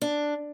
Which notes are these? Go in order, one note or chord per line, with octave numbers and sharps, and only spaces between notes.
D4